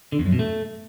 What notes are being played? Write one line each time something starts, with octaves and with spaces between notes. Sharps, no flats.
D3
E2
F#2
B2
A3